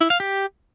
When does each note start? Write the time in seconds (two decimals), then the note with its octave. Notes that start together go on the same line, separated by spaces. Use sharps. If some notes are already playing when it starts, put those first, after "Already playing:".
0.01 E4
0.10 F5
0.20 G4